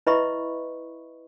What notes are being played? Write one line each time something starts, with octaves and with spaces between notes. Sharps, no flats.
E4 B4 D#5 E5 B5 C#6